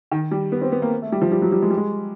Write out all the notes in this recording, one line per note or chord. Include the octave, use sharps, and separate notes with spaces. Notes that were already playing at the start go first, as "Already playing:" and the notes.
D#3
G3
B3
C4
B3
A#3
A3
G3
F3
G3
F#3
G3
G#3
G3
G#3